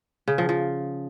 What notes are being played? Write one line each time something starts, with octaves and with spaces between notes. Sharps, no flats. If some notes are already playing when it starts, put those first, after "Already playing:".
C#3
F3
F3